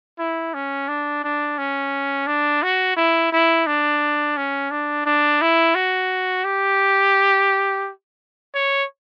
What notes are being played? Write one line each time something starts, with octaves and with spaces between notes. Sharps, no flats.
E4
C#4
D4
D4
C#4
D4
F#4
E4
E4
D4
C#4
D4
D4
E4
F#4
G4
C#5